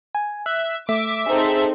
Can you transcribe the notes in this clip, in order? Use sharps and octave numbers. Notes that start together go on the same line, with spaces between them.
G#5
E5 F#6
A3 E5 D6
C4 D#4 G#4 A4